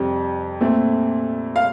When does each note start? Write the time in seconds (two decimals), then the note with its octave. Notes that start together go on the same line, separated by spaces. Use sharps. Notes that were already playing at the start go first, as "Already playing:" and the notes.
Already playing: F2 C3 G3 C4
0.60 A#2 A3 C4
1.56 F5